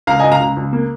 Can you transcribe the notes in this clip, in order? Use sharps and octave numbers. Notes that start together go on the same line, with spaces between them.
C#2 F5 A#5
D#5 G#5
C#2
F5 A#5
C#2
C#2
A#3